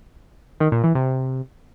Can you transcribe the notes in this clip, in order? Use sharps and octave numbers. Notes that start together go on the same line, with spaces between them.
D#3
A#2
E3
C3